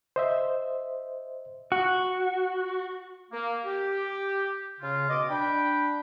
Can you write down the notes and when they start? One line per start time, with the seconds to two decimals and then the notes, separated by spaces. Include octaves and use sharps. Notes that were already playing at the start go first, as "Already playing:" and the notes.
0.16 C5 D#5 E5
1.72 F#4
3.32 A#3
3.65 G4
4.81 C#3 F4
5.10 B2 D#5 D6
5.30 D4 G5 B5